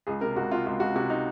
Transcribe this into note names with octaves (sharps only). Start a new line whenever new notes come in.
C#2 G#4
C3 A#4
C#2 F#4
C3 F4
C#2 F4
C#2 F#4
C3 F#4
D#4